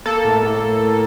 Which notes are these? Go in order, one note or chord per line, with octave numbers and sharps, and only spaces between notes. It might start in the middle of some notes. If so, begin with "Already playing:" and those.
A#3 A4
A2
A2